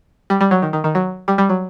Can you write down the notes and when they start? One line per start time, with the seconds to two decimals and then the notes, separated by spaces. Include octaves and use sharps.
0.30 G3
0.41 G3
0.51 F#3
0.62 D#3
0.73 D#3
0.84 D#3
0.95 F#3
1.28 G3
1.38 G3
1.49 F#3